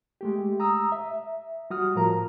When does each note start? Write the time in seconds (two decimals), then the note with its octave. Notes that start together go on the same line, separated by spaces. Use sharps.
0.21 G#3 A3 G4
0.60 A#5 D#6 E6
0.92 E5
1.70 G3 F#4 D#6 F6
1.95 A2 F3 A#4 A#5